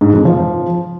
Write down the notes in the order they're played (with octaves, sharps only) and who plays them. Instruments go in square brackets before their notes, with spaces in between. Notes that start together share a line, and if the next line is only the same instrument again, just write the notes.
[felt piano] G#2
F2
F3